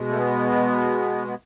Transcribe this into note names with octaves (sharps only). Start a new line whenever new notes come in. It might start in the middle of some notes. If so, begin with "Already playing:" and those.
Already playing: B2 G#3
A3
B3
B3